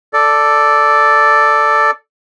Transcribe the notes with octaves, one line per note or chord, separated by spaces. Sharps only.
A4 D5